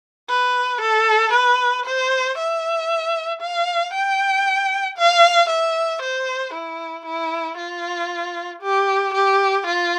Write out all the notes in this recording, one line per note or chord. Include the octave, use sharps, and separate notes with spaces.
B4
A4
B4
C5
E5
F5
G5
F5
E5
C5
E4
E4
F4
G4
G4
F4